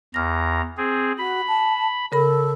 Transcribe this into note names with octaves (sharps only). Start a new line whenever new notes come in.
E2 A#5 F6 A#6
C4 G#4
F#4 B5
A5
C#3 A4 A#4 B5